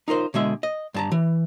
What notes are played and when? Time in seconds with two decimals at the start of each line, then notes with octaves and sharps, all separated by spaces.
0.08 D#4 F4 A#4 C5
0.34 B2 D3 G#3 E5
0.63 D#5
0.94 G2 A5 A#5
1.12 E3